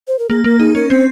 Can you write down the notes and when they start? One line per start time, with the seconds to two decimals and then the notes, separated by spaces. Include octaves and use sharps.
0.08 C5
0.19 A#4
0.29 A#3 G#4
0.44 A#3 A#4
0.59 D#4 G#4
0.75 C#4 A#4
0.90 C4 C5